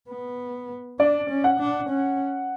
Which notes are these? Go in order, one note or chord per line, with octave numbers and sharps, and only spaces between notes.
B3
D4 D5
C#4
F#5
D4
C#4